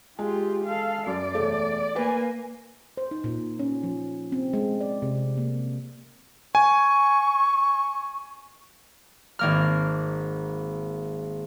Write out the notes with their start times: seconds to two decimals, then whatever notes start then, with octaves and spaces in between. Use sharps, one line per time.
0.19 G#3 F4 G4
0.66 A4 F5
1.06 F#2 D5
1.35 E1 A3
1.96 A#3 B4 G#5
2.97 C5
3.11 D#4
3.24 A#2
3.59 C#4
3.83 F3
4.32 C4
4.53 G#3
4.81 D5
5.02 C3
5.38 A#3
6.55 G#5 C#6
9.39 G#1 A#3 F6